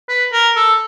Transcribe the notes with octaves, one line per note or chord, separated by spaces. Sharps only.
B4
A#4
A4